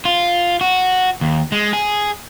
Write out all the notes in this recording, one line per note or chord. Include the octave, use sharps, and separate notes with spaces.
F4
F#4
D#2
G#3
G#4